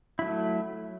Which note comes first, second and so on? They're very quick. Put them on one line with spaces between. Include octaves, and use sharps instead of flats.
E4 F#3 A3